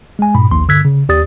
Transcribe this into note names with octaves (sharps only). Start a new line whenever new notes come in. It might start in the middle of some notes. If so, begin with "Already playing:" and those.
G#3 G#5
G2 A#2 B5
A#1 D#2 C6
G2 D3 E6 F#6 G#6 B6
C#3
D#2 G4 D5 D#6 A6